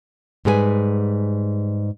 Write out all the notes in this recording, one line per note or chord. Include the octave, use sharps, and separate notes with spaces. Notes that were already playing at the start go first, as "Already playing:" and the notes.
G#2 G3 G#4 A#4 B4 G#5